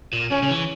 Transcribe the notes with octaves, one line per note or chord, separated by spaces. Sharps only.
A#2
C#3 C#4
C#3
E3